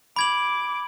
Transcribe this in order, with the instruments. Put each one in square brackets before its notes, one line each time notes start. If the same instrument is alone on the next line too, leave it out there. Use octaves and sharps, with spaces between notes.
[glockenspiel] B5 G#6 F#7 [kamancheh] D6